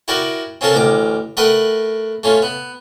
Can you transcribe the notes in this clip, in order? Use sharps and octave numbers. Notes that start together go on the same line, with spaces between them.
E4 F#4 A#4 D5 G5 A#5
C4 C#4 F4 A4 A#4 A5
A1 D2 A#5 D6
A3 A#4 B4 D#5 F#5 G5
A3 C#4 F4
B3